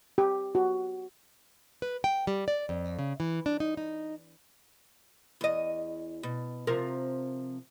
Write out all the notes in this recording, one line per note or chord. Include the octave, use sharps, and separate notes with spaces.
G4
F#4
B4
G5
G3
D5
F2
C#3
E3
D4
D#4
D#4
E2 D#5
B2
C3 F3 A#4